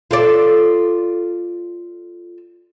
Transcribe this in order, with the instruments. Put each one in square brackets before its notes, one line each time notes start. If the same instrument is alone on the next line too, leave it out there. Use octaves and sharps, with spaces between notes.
[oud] F4 A4 D5